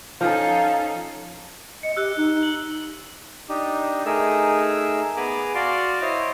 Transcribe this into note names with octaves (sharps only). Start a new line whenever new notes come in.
F3 C#4 D#4 A4 F5
D#5 C#7
G4 E6 F#6
D#4
F#7
D4 D#4 G4
A3 D#4 G#4 A#4 E6
B3 G#4 G#5 A#5 B5 D6
F#4 D5 F5 C6 D6
E4 C5 C#5 D#5